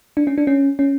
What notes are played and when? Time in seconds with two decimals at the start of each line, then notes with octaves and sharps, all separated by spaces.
0.17 D4
0.27 C#4
0.38 D4
0.47 C#4
0.79 C#4